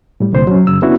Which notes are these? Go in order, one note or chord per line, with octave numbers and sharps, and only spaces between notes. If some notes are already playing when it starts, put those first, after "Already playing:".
A2 G3
C2 A#2 D3 C5 C6
F#3 C#4
F#2 C#3 E6
B3 C#4 D4 E4 F#4